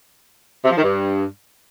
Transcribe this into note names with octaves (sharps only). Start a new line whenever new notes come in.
C3
F3
D#3
G2